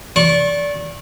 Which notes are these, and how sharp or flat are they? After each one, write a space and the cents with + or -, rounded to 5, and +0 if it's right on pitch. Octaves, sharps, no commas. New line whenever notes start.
D5 -20 C#6 -30